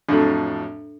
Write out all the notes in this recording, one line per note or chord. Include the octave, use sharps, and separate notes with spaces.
F2 A2 F#3 D4 A4